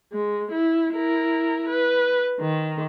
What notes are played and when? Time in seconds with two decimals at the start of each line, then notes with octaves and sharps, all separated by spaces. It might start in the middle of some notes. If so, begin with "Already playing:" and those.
0.13 G#3
0.51 E4
0.94 E4 A#4
1.69 B4
2.41 D#3